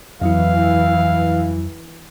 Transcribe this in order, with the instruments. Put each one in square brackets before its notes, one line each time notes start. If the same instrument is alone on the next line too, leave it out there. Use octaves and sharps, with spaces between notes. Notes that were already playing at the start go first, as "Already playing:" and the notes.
[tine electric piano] F2 F#3 E4 [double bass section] E3 [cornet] F5